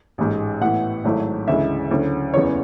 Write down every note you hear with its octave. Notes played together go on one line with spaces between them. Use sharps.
A1 G#2 G#3
A2 E3 B3 E4 F#5
G#1 G#2 F#3 A3 E4
D2 C#3 E3 G#3 E5
D2 C#3 F#3 C#4 E4
F#1 E2 C#3 E3 B3 C#5